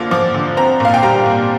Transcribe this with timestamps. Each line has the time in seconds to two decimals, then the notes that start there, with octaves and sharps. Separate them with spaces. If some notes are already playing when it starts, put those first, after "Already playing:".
Already playing: D3 F3 A#3 F4 D6
0.11 F3 D6
0.34 D3
0.57 C4 A#5
0.80 A#2 F5
0.94 G5
1.03 G3 A#5
1.26 A#2